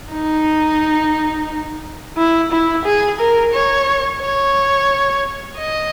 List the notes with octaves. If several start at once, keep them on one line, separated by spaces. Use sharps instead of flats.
D#4
E4
E4
G#4
A#4
C#5
C#5
D#5